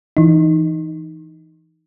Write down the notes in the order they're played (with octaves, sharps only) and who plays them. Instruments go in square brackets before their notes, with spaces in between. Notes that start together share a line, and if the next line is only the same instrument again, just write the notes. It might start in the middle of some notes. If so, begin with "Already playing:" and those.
[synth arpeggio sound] E3 D#4